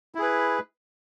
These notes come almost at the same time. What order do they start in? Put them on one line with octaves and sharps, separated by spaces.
E4 G#4 B4